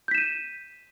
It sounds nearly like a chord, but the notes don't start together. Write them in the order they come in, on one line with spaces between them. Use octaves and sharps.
G6 B6 E7 D#7